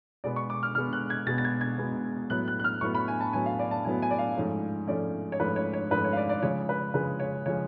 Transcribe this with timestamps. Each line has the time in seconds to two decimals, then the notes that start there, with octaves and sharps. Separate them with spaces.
0.24 B2 G#3 B3 D5
0.36 C#6
0.50 D6
0.63 F6
0.75 B2 G#3 B3 F6
0.93 F#6
1.10 G#6
1.27 B2 G#3 B3 A6
1.38 A6
1.45 G#6
1.61 G#6
1.78 B2 G#3 B3
2.30 A2 F#3 B3 F#6
2.48 F#6
2.60 F#6
2.64 F6
2.81 A2 F#3 B3 C#6
2.95 B5
3.08 G#5
3.21 A5
3.33 A2 F#3 B3 G#5
3.46 F5
3.59 D5
3.71 A5
3.85 A2 F#3 B3 G#5
4.02 G#5
4.11 D5
4.19 F5
4.36 G#2 F3 A3 C#4
4.88 G#2 F3 A3 C#4 D5
5.32 C#5
5.40 G#2 F3 A3 C#4 B4
5.56 C#5
5.73 C#5
5.91 G#2 F3 A3 C#4 B4
6.04 C#5
6.13 F5
6.17 D5
6.29 D5
6.42 C#3 F3 G#3 C#5
6.69 B4
6.94 C#3 F3 G#3 B4
7.20 C#5
7.45 C#3 F3 G#3 C#5